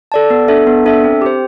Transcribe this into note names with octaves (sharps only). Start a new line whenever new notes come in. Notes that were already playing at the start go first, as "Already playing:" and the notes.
A4 D5 A5
B3
D4 A4 E5
B3
D4 A4 E5
C4
G4 C5